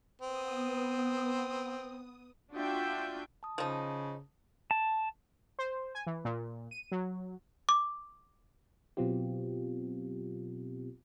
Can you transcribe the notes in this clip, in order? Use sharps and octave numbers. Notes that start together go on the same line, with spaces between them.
B3 C4 D#6
D4 F4 F#4 E5 G5
A5 D#6
C#3 F3 D#4
A5
C5
G#5
E3
A#2
D#7
F#3
D6
B2 F#3 B3 C4 F4 G4